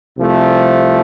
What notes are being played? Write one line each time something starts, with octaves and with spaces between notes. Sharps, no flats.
C2 C3 F3 A3